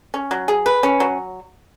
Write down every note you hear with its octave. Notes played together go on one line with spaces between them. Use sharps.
C#4
F#3
G#4
B4
C#4
F#3